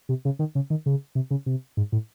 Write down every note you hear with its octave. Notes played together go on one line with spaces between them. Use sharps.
C3
C#3
D#3
C#3
D#3
C#3
C3
C#3
C3
G#2
A2